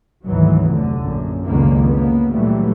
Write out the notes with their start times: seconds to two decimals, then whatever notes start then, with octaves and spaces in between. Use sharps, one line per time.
0.24 G#1 D2 E3 F#3
0.71 F1 D3
1.01 A#1 F#2
1.45 C#2 B2 D3 D#3 F#3 A#3
1.87 C#3 A#3 B3
2.31 A#2 D3 E3 F#3 G3 A3